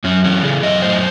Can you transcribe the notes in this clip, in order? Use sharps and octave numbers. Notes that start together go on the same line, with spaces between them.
F#2 C#4
E3 C#4
C#3 G#4
F#2 D#5
A2 C5